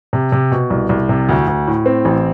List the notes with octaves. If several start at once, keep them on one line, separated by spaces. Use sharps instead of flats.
C3
C3
B2
C2
C2
C3
D2
D2
A2
C4
A1